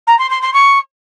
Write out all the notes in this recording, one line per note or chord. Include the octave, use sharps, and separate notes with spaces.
A#5
C6
C6
C6
C#6